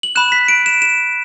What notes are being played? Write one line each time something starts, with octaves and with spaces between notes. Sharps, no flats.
F#7
B5 F#6 E7
B6
D7
E7
E7